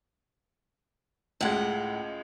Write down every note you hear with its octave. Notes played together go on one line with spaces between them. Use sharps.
C#2 A2 G#3 F#5